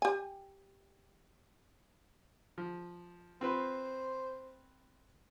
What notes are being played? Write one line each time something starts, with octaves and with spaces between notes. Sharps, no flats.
G4 G#5
F3
C4 F4 B4 C5